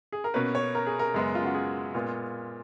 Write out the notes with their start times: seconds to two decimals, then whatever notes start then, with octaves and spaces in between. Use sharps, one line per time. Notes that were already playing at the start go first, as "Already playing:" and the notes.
0.12 G#4
0.24 A#4
0.34 B2 A#3 C#4 B4
0.55 C#5
0.75 A#4
0.87 G#4
0.99 A#4
1.14 F#2 C#3 G#3 B3
1.35 F4
1.45 F#4
1.54 G#4
1.94 A#2 G#3 B3 F4